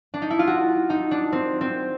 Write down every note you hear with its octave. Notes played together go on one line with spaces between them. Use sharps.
D4
D#4
E4
F4
F#4
D#4
D4
C4
C4